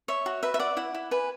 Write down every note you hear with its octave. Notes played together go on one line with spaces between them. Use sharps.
C#5 E5
F#4
B4 E5
E5
D5 F#5
E4 F#5
E4
B4 G#5